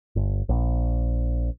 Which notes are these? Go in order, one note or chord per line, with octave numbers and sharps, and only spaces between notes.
G1
A#1